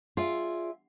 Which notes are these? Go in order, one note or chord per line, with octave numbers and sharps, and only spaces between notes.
F4 G#4 D5 E5